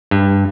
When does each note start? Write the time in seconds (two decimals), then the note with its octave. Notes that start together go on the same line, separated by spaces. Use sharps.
0.11 G2